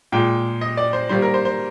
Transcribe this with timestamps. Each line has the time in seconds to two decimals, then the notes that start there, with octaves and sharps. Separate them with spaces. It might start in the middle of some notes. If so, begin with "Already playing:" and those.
0.12 A#2 G#3 G5
0.61 D#5
0.77 D5
0.93 C5
1.09 D#3 G3 A#3 C5
1.22 A#4
1.34 C5
1.45 C5